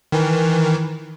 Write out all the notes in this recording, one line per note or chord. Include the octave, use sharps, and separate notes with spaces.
D#3 E3